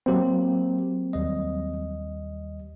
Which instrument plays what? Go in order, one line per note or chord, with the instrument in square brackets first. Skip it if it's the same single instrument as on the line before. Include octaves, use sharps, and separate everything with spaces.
[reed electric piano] F#3 C4 [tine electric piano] A#3 G4
[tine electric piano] D#2 G3 D#5